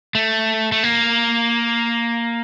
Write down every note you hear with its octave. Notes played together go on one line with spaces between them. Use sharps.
A3
A3
A#3